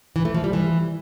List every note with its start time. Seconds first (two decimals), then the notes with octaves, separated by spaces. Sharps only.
0.16 E3
0.25 A3
0.34 F3
0.44 G3
0.53 E3